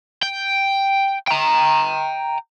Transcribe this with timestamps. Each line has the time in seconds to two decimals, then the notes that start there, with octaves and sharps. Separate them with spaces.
0.23 G5
1.28 G5 A#5